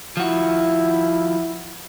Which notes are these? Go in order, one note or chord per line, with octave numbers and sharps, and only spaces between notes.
F3 E4 F#4